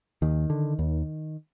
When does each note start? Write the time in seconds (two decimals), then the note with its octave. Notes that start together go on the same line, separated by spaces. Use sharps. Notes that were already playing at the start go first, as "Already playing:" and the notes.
0.22 D#2 D#3
0.50 D3
0.79 D#2